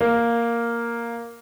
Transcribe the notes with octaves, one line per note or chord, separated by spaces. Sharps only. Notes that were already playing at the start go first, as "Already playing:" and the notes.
A#3